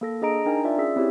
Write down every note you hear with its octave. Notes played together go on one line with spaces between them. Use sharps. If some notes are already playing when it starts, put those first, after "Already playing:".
A#3 A4 A#6
D4 G#4 D#5 A#5 D7
D4 D#4 A#4 G5 G#5
F4 D5 E5
C#4 G#4 E5 E6 B6
C4 E4 G4 C#5